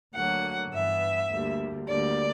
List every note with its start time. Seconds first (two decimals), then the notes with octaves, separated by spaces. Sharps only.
0.13 D2 D3 F#3 A#3 F#5
0.71 G2 E3 B3 E5
1.29 D2 D3 G3 A#3
1.86 D2 D3 G3 A#3 D5